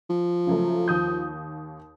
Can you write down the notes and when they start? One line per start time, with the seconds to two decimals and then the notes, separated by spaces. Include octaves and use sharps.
0.10 F3
0.47 C#3 F#3 A3
0.88 D#2 D#6 G6